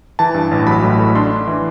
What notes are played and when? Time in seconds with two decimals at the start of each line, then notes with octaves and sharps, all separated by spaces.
0.19 E3 A5
0.34 G2
0.51 A1
0.67 F#3 B5
0.84 A2
0.99 A3
1.15 D4 C6
1.31 D4
1.47 E3